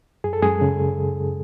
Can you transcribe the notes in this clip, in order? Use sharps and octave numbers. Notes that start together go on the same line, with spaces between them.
F#2 G#4
A4
F#2 G#3 G#4
C#3